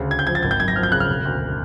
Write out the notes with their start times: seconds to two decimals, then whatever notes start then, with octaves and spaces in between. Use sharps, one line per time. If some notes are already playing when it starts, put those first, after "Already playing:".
Already playing: D2 C#3
0.10 D2 G#6
0.19 G6
0.27 F3 G#6
0.35 A6
0.43 G#1 G#6
0.51 G6
0.60 F#2 G#6
0.68 A#6
0.76 F3 F6
0.83 G6
0.92 C#3 F#6
1.00 F6
1.08 E1
1.25 D2